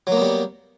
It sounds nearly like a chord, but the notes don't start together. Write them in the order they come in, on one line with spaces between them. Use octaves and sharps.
F#3 A#3 B3 G3